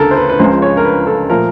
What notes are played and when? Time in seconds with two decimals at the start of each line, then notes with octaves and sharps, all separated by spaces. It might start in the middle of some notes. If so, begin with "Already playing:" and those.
Already playing: D2 C#3 A4 A#4
0.11 C5
0.17 B4
0.29 B4
0.39 C#2 C#3 F3 G#3 C5
0.62 C#5
0.77 A#4
0.85 B4
1.07 A4
1.30 A#2 F3 A3 A#4